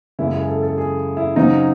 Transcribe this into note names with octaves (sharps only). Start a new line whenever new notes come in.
F#2 C#3 G#3 E4
G#4
A4
A4
G#4
E4
C#3 F#3 C4 D#4